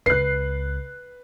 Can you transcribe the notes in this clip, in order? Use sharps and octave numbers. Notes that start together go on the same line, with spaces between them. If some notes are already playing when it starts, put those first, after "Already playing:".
C#2 B4 F#6 C7